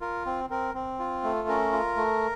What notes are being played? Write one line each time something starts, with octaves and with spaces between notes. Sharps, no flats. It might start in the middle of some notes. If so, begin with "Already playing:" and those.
F4 A#4
C4
C4 A#4
C4
F4
A3
C#4 A#4
F4
A3